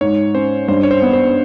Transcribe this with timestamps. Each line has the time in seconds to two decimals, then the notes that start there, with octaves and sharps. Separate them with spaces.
0.01 G#2 C#5
0.34 C#4 C5
0.68 G2 C5
0.83 C#5
0.91 C5
1.02 B3
1.13 C5